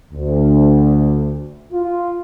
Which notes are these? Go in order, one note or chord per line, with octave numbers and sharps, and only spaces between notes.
D2
F4